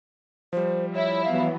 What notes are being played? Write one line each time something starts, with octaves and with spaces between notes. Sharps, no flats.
F3 G3 C5
E4 C#5
E3 F#3 B3 F5